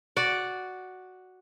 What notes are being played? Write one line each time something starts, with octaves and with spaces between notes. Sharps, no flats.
F#4 D5